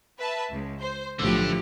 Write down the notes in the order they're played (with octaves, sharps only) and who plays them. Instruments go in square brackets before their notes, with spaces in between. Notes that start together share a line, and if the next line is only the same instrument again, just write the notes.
[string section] B4 E5 A5
C#2
C5
[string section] B1 A2 [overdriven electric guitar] D3 [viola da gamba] F3 A3 G4